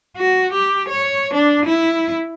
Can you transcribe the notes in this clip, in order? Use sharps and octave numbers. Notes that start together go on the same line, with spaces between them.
F#4
G4
C#5
D4
E4